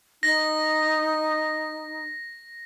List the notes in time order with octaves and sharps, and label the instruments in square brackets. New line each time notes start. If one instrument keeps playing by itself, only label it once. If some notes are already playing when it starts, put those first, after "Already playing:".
[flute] D#4 [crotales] A#6